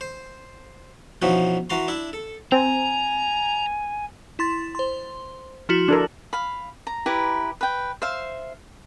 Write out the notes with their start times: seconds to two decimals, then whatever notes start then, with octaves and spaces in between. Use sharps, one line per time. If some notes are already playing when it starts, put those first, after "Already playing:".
0.01 C5
1.22 B2 E3 F3 C#4 D#4 F#4
1.70 E3 F#4 A5 A#5 C6
1.88 D4 E4 E5
2.13 A4
2.52 C4 G#5 A#5
4.39 E4 C6 A6
4.75 C5 C6
5.69 F3 E4 F#4
5.88 D4 A4 A#4 F#7
6.33 F5 B5
6.87 A#5
7.06 E4 G4 B4 A#5
7.61 B4 G5
8.02 C5 E5 F5